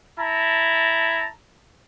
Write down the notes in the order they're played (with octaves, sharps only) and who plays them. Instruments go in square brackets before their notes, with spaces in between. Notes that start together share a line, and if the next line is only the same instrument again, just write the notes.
[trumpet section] E4 A5 A#5